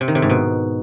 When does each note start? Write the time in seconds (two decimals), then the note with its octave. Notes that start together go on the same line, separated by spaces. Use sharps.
0.01 C3
0.08 D#3
0.15 C3
0.22 G#2
0.29 B2